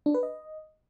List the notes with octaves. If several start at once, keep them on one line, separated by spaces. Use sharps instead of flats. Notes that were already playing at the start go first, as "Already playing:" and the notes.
D4
B4
D#5